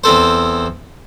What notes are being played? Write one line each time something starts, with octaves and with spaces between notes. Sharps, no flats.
E2 C4 A4 C5